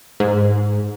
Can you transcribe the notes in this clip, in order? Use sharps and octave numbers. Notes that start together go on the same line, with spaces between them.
G#2